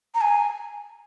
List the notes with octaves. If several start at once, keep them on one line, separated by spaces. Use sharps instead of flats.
A#5
G#5